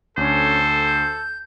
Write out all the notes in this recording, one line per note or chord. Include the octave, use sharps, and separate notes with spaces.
D2 C#4 A4 C5
G6